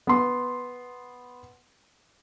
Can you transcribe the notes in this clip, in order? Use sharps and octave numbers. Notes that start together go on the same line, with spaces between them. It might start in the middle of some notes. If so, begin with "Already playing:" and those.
B3 C6